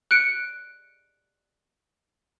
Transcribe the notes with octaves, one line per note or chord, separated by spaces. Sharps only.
F#6 C#7 D7